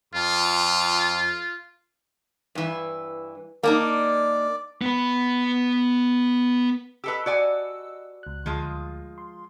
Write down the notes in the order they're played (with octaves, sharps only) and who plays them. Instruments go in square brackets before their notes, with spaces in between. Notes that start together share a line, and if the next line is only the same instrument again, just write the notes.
[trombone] F2 [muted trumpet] F4
[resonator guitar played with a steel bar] G2 E3
[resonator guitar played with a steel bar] A#3 D4 D#4 [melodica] D5
[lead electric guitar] B3 B4
[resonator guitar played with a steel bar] G4 A4 B4 [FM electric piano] D#5 E6
[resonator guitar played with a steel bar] F#4 D5 G#5
[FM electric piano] C#2 F#6
[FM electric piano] D2 [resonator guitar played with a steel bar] F3 G#3 F4
[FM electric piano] C6